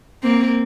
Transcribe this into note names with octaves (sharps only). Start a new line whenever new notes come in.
A#3 C4